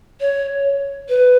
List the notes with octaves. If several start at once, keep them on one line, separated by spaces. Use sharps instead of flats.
C#5
B4